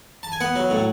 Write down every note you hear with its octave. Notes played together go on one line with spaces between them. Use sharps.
A5
G#5
B3 F#5
F#3
A2